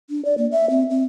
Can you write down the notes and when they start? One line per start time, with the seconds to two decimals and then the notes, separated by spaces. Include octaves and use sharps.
0.10 D4
0.25 D5
0.38 A#3
0.52 E5
0.70 C4
0.90 C4